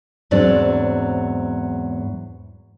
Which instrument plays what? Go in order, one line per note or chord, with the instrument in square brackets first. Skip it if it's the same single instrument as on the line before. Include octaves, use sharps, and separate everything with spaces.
[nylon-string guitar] E2 G#2 F#3 C4 D4 D5